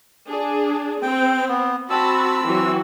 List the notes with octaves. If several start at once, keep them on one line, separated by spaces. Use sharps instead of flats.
D4 G#4
C4 G5
B3
C4 F#4 A5 B5 E6
E3 F#3 F#4